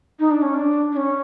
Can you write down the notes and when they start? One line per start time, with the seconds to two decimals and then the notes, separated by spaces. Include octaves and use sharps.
0.20 D#4
0.31 D4
0.42 C#4
0.54 D4
0.92 D4
0.97 C#4